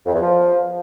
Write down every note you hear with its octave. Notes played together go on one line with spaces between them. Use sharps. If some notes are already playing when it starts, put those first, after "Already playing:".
F2
E2
F3